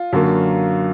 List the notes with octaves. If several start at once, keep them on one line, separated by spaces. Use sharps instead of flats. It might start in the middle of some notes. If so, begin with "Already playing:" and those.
Already playing: F4
F#2 D3 F#3 A#3